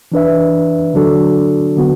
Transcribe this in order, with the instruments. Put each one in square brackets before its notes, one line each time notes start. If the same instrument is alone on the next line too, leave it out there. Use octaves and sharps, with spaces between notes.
[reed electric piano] E3 D4 B4 E5
D3 F#3 D4 F#4 A4
D3 B3 F#4